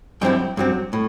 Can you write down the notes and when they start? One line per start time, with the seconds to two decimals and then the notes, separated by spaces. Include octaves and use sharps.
0.21 G2 F#3 C4 E4 G5
0.57 G2 F#3 C4
0.93 A2